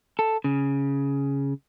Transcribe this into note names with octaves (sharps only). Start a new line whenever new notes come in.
A4
C#3